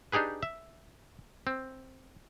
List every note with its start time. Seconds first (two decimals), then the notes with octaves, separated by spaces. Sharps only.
0.12 D4 D#4 G4 G#4 B4
0.43 E5
1.47 C4